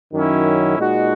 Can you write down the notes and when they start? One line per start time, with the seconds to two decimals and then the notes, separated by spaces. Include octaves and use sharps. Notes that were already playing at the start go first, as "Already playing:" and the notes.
0.13 F#2 D#3 F#3 C#4 E4
0.78 A#2 G#3 D#4 F#4